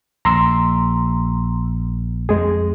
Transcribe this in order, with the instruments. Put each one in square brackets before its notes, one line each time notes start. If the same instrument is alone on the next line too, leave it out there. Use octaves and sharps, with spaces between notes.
[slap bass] A#1 [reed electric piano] A#5 C6 E6
[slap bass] F2 [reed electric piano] G#3 G#4